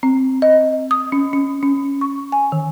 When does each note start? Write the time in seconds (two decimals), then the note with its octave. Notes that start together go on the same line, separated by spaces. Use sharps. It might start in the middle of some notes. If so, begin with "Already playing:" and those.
0.03 C4
0.42 D#5
0.91 D#6
1.12 C#4
1.33 C#4
1.63 C#4
2.01 C#6
2.32 G#5
2.52 D#3